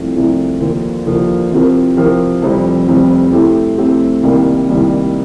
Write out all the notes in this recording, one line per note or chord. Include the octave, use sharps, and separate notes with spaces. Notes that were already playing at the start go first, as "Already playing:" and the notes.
Already playing: C2 C3 F3 A3
C2 C3 F3 A3
D#2 D3 F3 A#3
D#2 D3 F3 A#3
C3 F3 C4 G4 A#4
C3 F3 C4 G4 A#4
F1 F2 C3 G3 C4
F1 F2 C3 G3 C4
A2 A3 C4 G4 C5
A2 A3 C4 G4 C5
C2 C3 D#3 G3 A#3
C2 C3 D#3 G3 A#3